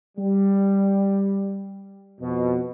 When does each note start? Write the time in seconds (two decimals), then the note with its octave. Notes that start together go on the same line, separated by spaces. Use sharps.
0.18 G3
2.20 F2 B2